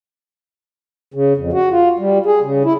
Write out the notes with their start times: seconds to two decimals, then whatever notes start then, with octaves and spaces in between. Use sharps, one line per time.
1.14 C#3
1.37 F2
1.53 F#4
1.71 F4
1.99 G3
2.26 G#4
2.41 C#3
2.65 E4